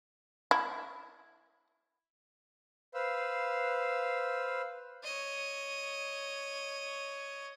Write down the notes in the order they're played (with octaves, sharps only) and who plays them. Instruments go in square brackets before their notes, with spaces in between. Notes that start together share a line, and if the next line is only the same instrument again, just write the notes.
[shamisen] E4
[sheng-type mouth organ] B4 C5 F5 E6
[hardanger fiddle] C#5 D#5